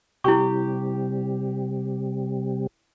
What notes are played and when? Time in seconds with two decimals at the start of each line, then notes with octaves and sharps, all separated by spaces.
0.24 C3 G3 E4 G4 C#6